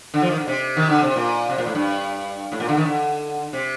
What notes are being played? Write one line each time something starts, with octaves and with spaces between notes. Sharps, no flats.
D3
F3
D#3
D3
C3
D#3
D3
C3
A#2
C3
A#2
A2
G2
A2
A#2
D3
D#3
D3
C3